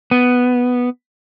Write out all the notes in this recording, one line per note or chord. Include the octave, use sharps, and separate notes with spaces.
B3